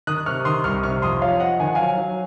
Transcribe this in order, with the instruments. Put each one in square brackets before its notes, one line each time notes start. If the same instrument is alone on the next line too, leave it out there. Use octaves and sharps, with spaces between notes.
[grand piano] D#3 D#6 F#6
C3 C#6 F6
D#3 C6 D#6
C2 C#6 F6
C3 C#6 F6
F2 C6 D#6
F3 C#5 F5
F3 D#5 F#5
D#3 G#5
F#5
F#3 F5 G#5
F#3